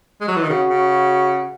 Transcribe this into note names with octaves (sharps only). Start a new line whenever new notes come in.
G#3
F#3
E3
D#3
C#3 F#4
C#3